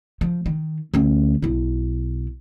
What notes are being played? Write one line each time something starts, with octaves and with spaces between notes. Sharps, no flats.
F3
D#3
D2 C#4
B1 E4